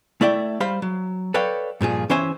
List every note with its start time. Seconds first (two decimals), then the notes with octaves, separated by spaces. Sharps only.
0.21 A3 E4 D5 E5 G5
0.60 G3 C5 F5 B5
0.82 F#3
1.34 A4 B4 C#5 D5 F5 G5
1.81 G2 A#2 F3 G#4
2.10 E3 C#4 G4 C5 E5 G#5